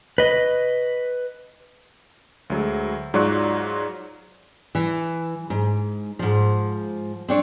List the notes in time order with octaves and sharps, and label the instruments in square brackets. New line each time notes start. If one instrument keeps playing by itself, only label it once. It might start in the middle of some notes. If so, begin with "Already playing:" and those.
[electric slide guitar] B4 D#5
[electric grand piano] D2 F#3 G#3
G#2 F#3 F4 D5 C#6 F#6
[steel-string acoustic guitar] E3
G#2
G#2 F3
C4 D4 C#5